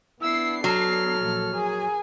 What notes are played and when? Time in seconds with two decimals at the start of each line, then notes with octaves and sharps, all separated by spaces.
0.22 B3 D4 E4 E6 C7
0.64 F#3 A4 F6
1.19 A#1 A#2
1.55 G#4 A#4 G#5